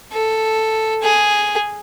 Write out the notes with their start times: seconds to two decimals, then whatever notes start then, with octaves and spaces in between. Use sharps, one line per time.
0.12 A4
1.02 G#4